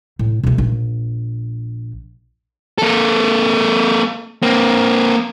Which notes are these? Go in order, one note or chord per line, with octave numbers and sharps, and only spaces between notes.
A2
B2 A3
A#1
A#3 A4
A#3 C4